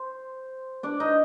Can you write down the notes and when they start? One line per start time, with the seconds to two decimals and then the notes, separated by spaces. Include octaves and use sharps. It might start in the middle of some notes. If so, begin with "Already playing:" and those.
Already playing: C5
0.83 D4 D5
1.00 D#4 D#5